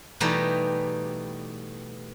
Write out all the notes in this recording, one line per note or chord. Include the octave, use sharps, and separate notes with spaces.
B2 E3 G3 A3 D#4 G4